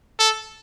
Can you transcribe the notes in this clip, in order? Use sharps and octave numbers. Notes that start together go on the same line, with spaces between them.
A4